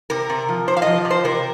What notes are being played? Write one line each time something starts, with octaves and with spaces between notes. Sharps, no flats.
C3 A#4
C3
F3
C3 C5
F5
F3 D#5
C3
C5
C3 A#4